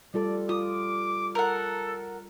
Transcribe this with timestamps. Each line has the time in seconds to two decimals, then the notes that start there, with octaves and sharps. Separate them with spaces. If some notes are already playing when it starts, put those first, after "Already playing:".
0.14 G3 F4 A4 D5
0.49 F4 D6 D#6
1.35 A4 A#4 F#5